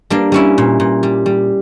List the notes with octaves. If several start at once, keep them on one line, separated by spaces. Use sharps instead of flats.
G3 A#3 D4
G3 C#4 E4
A#2
A#2
G3
G3